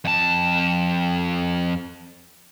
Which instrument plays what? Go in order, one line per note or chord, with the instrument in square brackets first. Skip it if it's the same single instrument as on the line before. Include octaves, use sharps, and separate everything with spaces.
[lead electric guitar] F2 A5